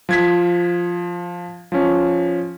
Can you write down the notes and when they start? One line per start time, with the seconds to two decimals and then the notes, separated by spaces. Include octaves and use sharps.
0.09 F3 G#6 B6
1.72 F3 C#4